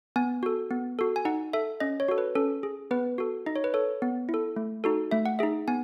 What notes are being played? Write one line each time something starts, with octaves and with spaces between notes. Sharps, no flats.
B3 G#5
F#4 A4
B3
F#4 A4
G#5
D#4 F#5
A4 E5
C#4 D#5
C#5
F#4 A4
B4
C#4 A4
G#4
B3 B4
F#4 A4
D#4 D#5
C#5
B4
A4 C#5
B3
E4
A4
A3
D#4 F#4 A4
A3 E5
F#5
D#4 G#4 E5
B3 G#5